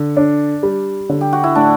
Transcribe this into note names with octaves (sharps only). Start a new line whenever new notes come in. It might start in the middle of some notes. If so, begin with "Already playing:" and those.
Already playing: D3
D4
G3
D3
G4
F#4
E4
A2 D4